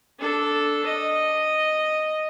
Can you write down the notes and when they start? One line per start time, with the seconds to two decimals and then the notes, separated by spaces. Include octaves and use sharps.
0.19 D4 A4
0.86 D#5